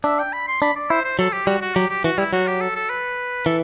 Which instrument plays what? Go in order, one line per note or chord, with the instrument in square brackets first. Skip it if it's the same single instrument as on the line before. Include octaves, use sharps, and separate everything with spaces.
[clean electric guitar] D4 [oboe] E5
[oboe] G5
B5
C6
[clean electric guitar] D4 [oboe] B5
[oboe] D5
[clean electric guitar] E4 [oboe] C5
[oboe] C5
[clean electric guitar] F#3 [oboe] A4
[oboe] G4
[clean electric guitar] G3 [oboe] F#4
[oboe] F#4
[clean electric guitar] F#3 [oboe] G4
[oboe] G4
[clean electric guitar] E3 [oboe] F#4
[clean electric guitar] G3 [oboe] E4
[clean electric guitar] F#3 [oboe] F#4
[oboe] G4
A4
A4
B4
[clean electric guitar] E3 [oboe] A4